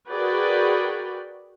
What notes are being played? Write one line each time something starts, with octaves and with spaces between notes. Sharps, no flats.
F#4 G#4 A#4 B4 D5 G5